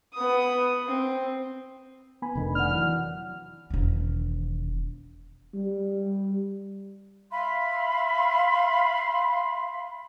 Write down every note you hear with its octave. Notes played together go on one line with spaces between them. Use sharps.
B3 D#6
C4
B3 G#5 B5
F1 D3 D#3
D5 F#5 F6
E3 F#3
E1 D#3
G3
E5 F5 B5 C6